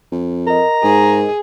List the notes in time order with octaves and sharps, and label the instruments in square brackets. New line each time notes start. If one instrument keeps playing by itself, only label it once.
[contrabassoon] F2
[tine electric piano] A#4 D#5 [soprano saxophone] A#5
[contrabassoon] G#2 [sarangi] G#4